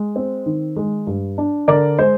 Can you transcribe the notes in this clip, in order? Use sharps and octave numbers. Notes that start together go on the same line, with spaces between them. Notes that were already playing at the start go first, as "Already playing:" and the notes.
Already playing: G#3
C4
D#3
G#3
G2
D4
D3 A#4 D5
G#3 C5